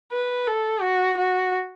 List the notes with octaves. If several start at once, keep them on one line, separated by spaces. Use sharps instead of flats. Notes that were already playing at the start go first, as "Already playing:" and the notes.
B4
A4
F#4
F#4